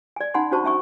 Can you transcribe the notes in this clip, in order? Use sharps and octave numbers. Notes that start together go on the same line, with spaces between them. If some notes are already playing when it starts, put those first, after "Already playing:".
D5 G#5
C#4 D#4 F#5 G#5 B5 C6
C#4 D4 F#4 C5 A5 C#6
C#4 E5 G#5 C#6